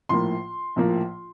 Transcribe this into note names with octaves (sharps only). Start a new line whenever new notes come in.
A#1 A2 F3 A#3 C6
A#1 A2 F3 A#3